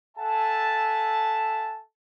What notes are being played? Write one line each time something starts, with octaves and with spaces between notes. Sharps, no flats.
A4 E5 F#5 G#5 A5